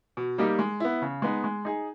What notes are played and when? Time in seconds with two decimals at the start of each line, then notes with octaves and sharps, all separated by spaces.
0.17 B2
0.38 G3 A#3 D#4 G4
0.59 G#3
0.80 B3 E4
1.02 C#3
1.22 G#3 B3 D#4
1.44 G#3
1.65 D#4 G#4